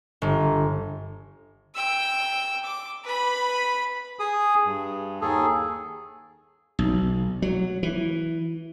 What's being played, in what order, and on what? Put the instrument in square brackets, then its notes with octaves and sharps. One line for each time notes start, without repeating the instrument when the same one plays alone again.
[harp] G1
[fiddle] G5 E6
D6
B4 B5
[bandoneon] G#4 D#6
G2
D#2 D#3 G#4 A4
[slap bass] B1
F#3
E3